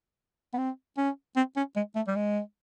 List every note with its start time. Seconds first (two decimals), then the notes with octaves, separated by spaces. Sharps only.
0.53 B3
0.58 C4
0.97 C#4
1.36 C4
1.56 C#4
1.76 G#3
1.95 A3
2.07 G3
2.16 G#3